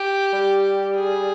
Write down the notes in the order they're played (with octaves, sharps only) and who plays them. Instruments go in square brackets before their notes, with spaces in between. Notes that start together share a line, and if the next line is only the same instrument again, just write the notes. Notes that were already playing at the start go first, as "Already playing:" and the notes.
Already playing: [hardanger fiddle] G4
[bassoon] G3
[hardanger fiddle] G#4